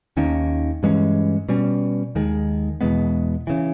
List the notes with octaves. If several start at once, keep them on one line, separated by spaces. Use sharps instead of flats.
D#2 D#3 A#3 C#4
G2 E3 G#3 C#4
B2 G3 C#4
D#2 D#3 G#3
E2 B2 G#3 B3
C#3 E3